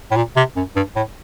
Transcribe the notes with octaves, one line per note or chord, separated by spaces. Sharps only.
A2
A#2
C3
F#2
G2
A2